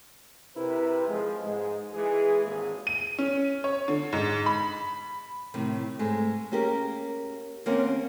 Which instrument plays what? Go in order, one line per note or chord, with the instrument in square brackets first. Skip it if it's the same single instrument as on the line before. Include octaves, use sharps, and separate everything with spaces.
[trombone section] C3 E4 A#4 B4
F3 G#3
G#2 G#3
E3 G#3 G#4
G#1 D#2 G#2 A#3 G#4
[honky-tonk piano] D#7
C#4
C#5
D3
G#2
B5
[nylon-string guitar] A2 C3 D#3
G#2 G#3 A3
A#3 C#4 G4 G#4 A#4
D#2 A#3 C4 C#4 A#4 F#5